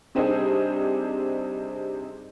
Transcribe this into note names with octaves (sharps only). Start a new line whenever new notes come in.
C3 G3 C4 D4 D#4 G#4